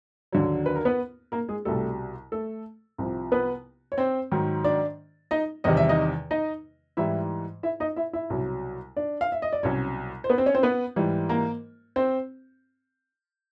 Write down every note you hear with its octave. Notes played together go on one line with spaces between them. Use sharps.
D#2 D3 F#3
B4
A#4
B3 B4
A#3 A#4
G#3 G#4
C2 B2 G3 A3 A4
A3 A4
C2 C3 F3
B3 B4
C#5
C4 C5
G#2 D#3 F#3
D4 D5
D#4 D#5
E2 C3 D#3 G3 D#5
E5
D#4 D#5
D#4 D#5
G#2 E3 G3 E4 E5
E4 E5
D#4 D#5
E4 E5
E4 E5
C2 B2 F#3
D4 D5
F5
E5
D#5
D5
C2 B2 F#3 C#4 C#5
C5
B3 B4
C4 C5
C#4 C#5
C4 C5
B3 B4
G#2 E3 G3
A#3 A#4
C4 C5